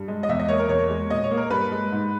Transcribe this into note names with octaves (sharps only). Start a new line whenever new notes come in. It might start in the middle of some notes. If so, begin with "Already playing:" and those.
Already playing: G2
G#3
D#5
E2 E5
D#5
A#3 C#5
A#4
E2 C#5
G#3
A#2 D#5
C#5
A#3
A#4
G2 B4
G#3
G#2